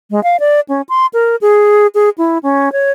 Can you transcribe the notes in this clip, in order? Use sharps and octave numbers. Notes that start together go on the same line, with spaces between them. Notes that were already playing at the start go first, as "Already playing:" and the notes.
G#3
F5
D5
C#4
C6
A#4
G#4
G#4
E4
C#4
C#5